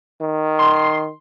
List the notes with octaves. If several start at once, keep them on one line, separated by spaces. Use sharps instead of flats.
D#3
C6